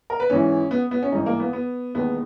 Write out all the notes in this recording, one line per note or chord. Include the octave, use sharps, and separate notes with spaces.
A#4
B4
G#1 G#2 E3 C#4
B3
B3
C#4
G#1 G2 E3 D#4
A#3
B3
B3
E1 D#2 D#3 B3